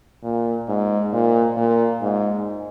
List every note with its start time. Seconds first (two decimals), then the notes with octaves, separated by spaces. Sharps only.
0.24 A#2
0.68 G#2
1.13 A#2
1.57 A#2
2.01 G#2